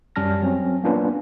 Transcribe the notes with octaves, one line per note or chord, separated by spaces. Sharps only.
F#2 G3 C#4 A5 F6 A#6
F#3 C4 C#4
A#3 B3 C#4 D4 F4 B4